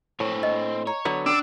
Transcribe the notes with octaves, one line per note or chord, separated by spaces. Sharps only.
A2 C4 C#5
D#5
C#5 A#5
D3 F#3 B3 D5 A#5
C#4 D4 D6 E6